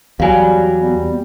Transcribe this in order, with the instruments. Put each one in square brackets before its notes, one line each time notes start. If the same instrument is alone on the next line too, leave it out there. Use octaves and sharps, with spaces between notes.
[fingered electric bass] E2 F#3 [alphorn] G3 [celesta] F5 G#5
[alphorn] G3 [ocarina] B3